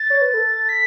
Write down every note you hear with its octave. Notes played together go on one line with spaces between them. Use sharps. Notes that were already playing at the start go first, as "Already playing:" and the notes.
Already playing: A6
C#5
B4
A4
B6